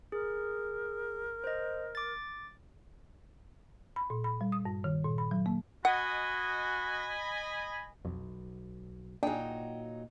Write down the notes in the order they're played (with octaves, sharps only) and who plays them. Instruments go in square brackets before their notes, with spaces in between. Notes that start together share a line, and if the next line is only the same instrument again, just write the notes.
[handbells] G#4 [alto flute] A#4
[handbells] C5 D#5
D6 A6
[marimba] B5
A#2
B5
G3
D#6
G2
D#3
A#2
B5
F#3
A#3
[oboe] F#4 [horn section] D#5 G#5 B5 [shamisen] F#5
[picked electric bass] B1 [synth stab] F2
[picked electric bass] A#2 [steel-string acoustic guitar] F#3 D#4 [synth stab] D4 G#4 [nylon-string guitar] G5